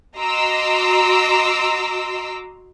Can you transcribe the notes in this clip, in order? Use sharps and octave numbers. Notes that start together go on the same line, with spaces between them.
F#4 D#5 A#5 C6 D6 E6